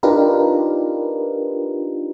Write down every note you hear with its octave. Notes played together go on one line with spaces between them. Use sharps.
D4 D#4 F4 G4 A#4 B4